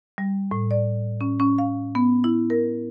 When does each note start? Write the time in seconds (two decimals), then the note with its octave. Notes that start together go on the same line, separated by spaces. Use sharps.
0.18 G3
0.51 A2
0.71 D5
1.21 C#4
1.40 C#4
1.58 F5
1.95 B3
2.24 E4
2.50 A#4